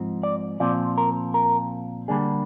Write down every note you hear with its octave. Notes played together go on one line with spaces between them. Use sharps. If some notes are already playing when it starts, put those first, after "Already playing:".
Already playing: G#2 F3 C4
D5
A#2 F3 C4 D5
A#4
A#4
D3 G3 A#3 D4 G#4